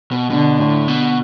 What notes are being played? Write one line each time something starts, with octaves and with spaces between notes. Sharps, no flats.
B2
B2 D3
A2
B2